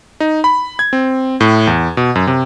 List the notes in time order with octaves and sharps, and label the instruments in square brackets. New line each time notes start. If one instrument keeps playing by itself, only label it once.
[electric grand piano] D#4
B5
G#6
C4
A2
E2
B2
F#2
C3